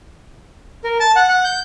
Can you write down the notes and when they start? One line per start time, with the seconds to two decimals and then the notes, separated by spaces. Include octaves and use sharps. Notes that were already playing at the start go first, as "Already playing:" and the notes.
0.84 A#4
1.00 A5
1.16 F#5
1.29 F#5
1.44 G6